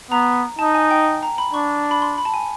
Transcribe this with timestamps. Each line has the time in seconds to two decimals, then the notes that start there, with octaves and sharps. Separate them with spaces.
0.11 B3 A#5
0.59 D#4 A5
0.74 G#5
0.91 G5
1.23 A#5
1.38 B5
1.54 D4 C#6
1.91 B5
2.02 C6
2.18 B5
2.25 A5
2.34 G#5